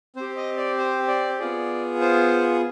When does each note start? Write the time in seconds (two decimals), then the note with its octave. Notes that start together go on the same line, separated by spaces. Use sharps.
0.16 C4 G4 C5
0.37 D#5
0.57 D5
0.78 C5
1.08 D5
1.39 B3 F4 G#4 D5
2.01 C5